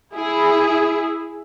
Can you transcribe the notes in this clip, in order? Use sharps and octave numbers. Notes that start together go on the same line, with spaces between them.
E4 G#4